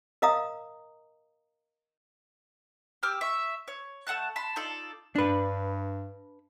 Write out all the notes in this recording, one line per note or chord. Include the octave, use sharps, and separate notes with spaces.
A#4 D#5 F5 A#5 D#6
G4 D6 E6 F6
E5 C#6
C#5
A3 F#5 A5 F#6
A5 B5 C6
D#4 F4 A4 D5
G2 D4 B4